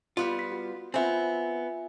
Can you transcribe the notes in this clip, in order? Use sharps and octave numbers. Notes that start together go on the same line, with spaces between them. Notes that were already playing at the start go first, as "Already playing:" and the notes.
G3 B3 F4
B6
F#4
B3 C4 F4 E5 G#5